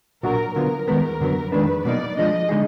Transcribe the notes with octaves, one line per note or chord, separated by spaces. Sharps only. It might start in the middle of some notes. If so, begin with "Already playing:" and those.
B1 A#2 F#3 D4 F#4 A#4
D3 F#3 B3 F4 A#4
D#2 D#3 G#3 B3
F#2 D3 F#3 B3
F2 D#3 G#3 D4 B4
B2 F#3 A#3 D#4 D5
F3 G#3 D4 D#5
D3 G#3 D#4 G#4